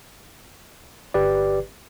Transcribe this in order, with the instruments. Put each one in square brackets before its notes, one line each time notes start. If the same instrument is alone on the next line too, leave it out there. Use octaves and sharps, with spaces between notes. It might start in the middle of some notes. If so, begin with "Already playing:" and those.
[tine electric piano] G1 G4 B4 D5